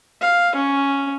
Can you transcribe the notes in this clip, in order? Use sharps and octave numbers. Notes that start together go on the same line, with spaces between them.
F5
C#4